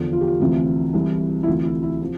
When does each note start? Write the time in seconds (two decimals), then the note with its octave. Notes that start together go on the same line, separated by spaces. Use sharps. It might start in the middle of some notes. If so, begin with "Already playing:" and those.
Already playing: E2 D3 F3
0.13 F4
0.21 G4
0.28 F4
0.40 D2 C3 E3
0.93 C2 C3 E3
1.43 E4
1.47 D2 C3 E3 F4
1.65 E4
1.83 E4
2.01 C3 F3